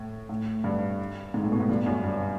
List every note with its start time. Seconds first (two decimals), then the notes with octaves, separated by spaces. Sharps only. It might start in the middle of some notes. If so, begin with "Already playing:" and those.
Already playing: A2
0.29 A2
0.64 G2
1.34 G#2
1.43 A2
1.52 B2
1.60 A2
1.69 G2
1.86 F#2
2.04 G2